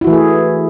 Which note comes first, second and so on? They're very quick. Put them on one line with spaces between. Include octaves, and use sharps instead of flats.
E4 F#4 E3 A3 G#4